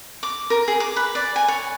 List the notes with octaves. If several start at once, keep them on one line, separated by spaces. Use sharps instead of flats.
D6
A#4
G#4
D6
B4
D5
G#5
C#5